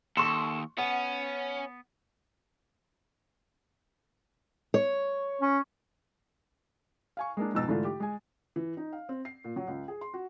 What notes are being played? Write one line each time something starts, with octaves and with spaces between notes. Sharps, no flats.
D#2 A4 C6 C#6
B3 C#4 F#5
C#5
C#4
F5 G#5 C#6
G#3 A#3 D4
F2 G#2 B2 D#4 E6 A6
G#2 D3 E3 A3 F4
G4
G#3 G#5
E3
D#4
F5
C4
C7
A#2
F#3
C#2
G#4
C6
F#4